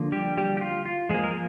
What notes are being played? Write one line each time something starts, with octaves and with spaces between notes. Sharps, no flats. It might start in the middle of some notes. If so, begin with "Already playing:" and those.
Already playing: D3 F3 A#3
G3 G4
G3 G4
G4
F4
F4
F3 G#3 A#3 G#4
A#4